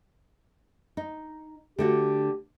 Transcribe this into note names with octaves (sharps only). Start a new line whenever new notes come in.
D#4
D3 A3 F#4 G4